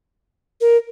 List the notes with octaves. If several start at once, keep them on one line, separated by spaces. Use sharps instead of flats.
A#4